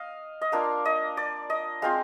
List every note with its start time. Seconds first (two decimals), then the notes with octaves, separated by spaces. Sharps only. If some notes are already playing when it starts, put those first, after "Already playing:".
Already playing: D#5 F5
0.41 D#5
0.52 A#3 D4 F4 F5
0.85 D#5
1.17 D5
1.50 D#5
1.82 G#3 C4 F4 F5